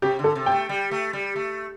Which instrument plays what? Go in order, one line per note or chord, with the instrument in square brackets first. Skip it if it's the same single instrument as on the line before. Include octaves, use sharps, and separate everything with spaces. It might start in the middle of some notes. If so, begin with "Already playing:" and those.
[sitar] C3 [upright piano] G4
[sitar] D3
[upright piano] A4
[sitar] C3
[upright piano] G5
[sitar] A3
G3
A3
G3
A3